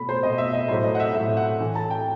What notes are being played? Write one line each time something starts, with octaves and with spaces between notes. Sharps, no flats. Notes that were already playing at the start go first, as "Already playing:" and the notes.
Already playing: B2 A3 B5
C5
B2 A3 D#5
E5
D#5
A2 F#3 A3 C5
D#5
F#5
E5
A2 F#3 A3 E5
F#5
A2 E3 A3
A5
G5